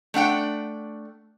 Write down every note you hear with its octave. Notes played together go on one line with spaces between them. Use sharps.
A3 D4 F#5 G5